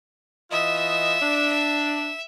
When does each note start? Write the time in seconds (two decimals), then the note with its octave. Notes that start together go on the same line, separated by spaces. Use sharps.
0.51 E3 F4 D#5 E5
1.22 D4